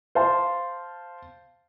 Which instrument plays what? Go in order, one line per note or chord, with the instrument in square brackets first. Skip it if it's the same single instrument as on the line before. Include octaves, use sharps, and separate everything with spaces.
[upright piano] C5 F5 A5